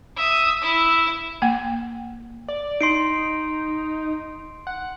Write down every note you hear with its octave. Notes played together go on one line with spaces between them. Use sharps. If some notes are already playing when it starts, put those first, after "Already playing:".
E5 D#6
E4 E5
A#3 F#5
D5
D#4 C6 C7 D7
F#5